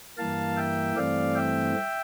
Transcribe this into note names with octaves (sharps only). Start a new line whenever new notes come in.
G2 E3 A#3 F5 A5
E5 G5
G2 E3 A3 C4 D5 F5
E5 G5